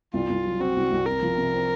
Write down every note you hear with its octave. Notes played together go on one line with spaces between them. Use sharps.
C2 F4
C2
F#3
C4 F#4
C2
C2
C4 A#4
F3
C3
C4